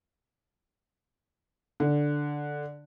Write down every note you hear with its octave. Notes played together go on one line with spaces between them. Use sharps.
D3